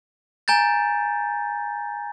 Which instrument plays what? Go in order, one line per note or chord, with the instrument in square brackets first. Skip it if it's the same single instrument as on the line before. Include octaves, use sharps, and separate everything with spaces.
[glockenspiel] G#5 A#5 G6 A6